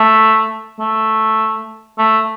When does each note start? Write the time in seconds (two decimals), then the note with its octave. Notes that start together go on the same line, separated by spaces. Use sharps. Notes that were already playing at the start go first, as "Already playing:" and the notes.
Already playing: A3
0.80 A3
1.99 A3